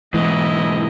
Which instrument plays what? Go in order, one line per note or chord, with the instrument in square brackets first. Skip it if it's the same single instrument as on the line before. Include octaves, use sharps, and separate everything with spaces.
[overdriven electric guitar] G#2 B2 [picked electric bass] E3 [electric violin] E4 D#5